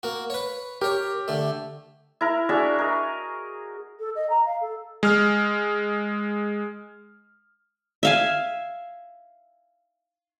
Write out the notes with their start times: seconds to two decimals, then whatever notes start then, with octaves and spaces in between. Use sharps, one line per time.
0.03 A#3 F#4
0.30 B4 C#5
0.82 G4 A#4 C#5
1.28 D3 A3
2.21 E4 A#4
2.49 D4 F#4 G#4 E5
2.78 A#4 D#5
3.99 A4
4.15 D#5
4.29 A#5
4.45 F5
4.61 A4
5.03 G#3 F6
8.03 E5 F5 G#5